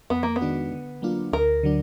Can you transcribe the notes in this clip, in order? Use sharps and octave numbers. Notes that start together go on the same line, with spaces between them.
F2 B3
A#3
B3
D#3 G#3 D4 F#4
D3
F#3 A#3 D4 F4
D2 A#4
D3 F#3 D4